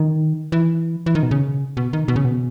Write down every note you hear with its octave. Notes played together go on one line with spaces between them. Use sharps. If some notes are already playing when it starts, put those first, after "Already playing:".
Already playing: D#3
E3
E3
D#3
B2
C#3
B2
D#3
B2
C#3
B2